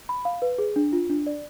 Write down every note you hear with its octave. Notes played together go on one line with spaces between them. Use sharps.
B5
F5
B4
G#4
D4
F4
D4
D5